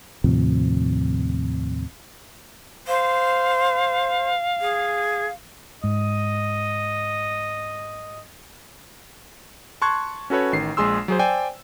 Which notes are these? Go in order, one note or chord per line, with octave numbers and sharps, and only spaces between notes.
D#2 A2 C3 F3
C5 F5
G#4
G#2 D#5
A5 C6 C#6 F#6 G#6
C#4 F#4 A4 B4 C#5
A1 D#3 C7
A#1 G#3 G#4 C6 E6
F#3 G#4 C5
C5 D5 G5 G#5